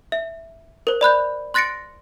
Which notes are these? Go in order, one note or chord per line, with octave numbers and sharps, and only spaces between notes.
E5
A#4 C5
D5 B5 F#6 G6
C6 F#6 A6 A#6 C#7 D7